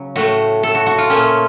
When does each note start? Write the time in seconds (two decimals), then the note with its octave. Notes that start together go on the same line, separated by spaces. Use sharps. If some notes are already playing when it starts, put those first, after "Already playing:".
Already playing: C#3 F#3
0.16 A2 A3 F#4
0.63 A4
0.75 F#4
0.86 F#4
0.98 F4
1.10 A#2 A3 C#4